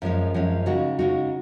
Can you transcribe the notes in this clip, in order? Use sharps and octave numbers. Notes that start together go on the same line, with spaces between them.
F#2 F3 G#3 C#4
F#2 F3 G#3 C#4
C#3 G#3 D#4 F#4
C#3 G#3 D#4 F#4